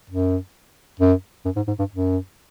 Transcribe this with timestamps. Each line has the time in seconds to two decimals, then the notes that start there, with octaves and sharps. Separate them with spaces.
0.10 F#2
1.00 F#2
1.45 F#2
1.56 G#2
1.67 G#2
1.79 G2
1.91 F#2